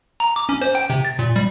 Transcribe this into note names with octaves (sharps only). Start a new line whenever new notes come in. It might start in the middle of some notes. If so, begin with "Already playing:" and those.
A#5
D6
C#4
C5
G5
C3
A6
A#2
G3